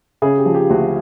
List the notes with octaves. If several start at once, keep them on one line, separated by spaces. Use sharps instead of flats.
C#3 G#4
G4
F3
G4
D2 F#4